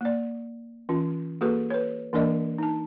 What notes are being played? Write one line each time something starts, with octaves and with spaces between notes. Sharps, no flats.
A#3 D5
E3 C#4 F4
A#3 F#4 G#4 A4 B4
B4 C#5
E3 A#3 D4 A#4 D5 D#5
D#4 A5